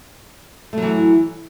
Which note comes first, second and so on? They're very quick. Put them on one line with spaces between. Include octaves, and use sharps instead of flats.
A3 F#3 E3